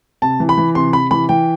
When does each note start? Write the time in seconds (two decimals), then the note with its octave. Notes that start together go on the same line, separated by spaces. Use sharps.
0.22 C3 A5
0.40 E3
0.49 B5
0.58 E3
0.75 C3 C6
0.93 C3 B5
1.11 E3 B5
1.29 E3 G5